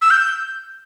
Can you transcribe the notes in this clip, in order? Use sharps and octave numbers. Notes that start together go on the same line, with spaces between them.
E6
G6